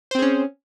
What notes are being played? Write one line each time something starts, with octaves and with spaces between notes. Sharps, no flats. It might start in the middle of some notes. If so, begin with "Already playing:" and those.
C4 C#4 G#4 C5